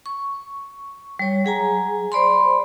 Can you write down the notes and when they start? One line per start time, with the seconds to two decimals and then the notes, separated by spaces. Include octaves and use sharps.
0.06 C#6
1.19 G3 C#5
1.45 F#3 G#4 G#5 A#5
2.12 C5 D5 B5 C6